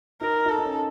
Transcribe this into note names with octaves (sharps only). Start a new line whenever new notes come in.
D#4 A#4
D#4 A4
D#4
C#4